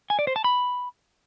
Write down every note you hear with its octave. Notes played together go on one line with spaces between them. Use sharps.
G#5
D5
C5
A5
B5